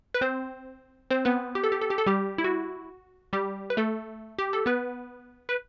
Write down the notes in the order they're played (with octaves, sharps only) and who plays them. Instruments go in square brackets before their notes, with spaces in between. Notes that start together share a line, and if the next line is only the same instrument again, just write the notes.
[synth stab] B4
C4 C5
C4 C5
B3 B4
G4
A4
G4
A4
G4
A4
G3 G4
E4
F#4
G3 G4
B4
A3 A4
G4
A4
B3 B4
B4